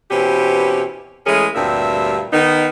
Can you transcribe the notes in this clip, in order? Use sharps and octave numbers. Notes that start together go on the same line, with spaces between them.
B2 E3 C4 C#4 G4
E3 G#3 A3 C#4 G#4 A#4
D2 G2 A#2 G3 C4 E5
D#3 B3 D#4